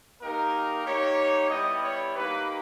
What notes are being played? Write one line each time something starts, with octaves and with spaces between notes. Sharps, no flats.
A#3 D#4 G4 A#4
A#3 D#4 G4 C#5
G3 B3 E4 G4 D#5
C#5
A#3 D#4 G4 B4